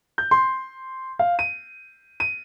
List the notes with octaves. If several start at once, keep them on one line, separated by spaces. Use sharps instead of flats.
G6
C6
F5
D#7
D#7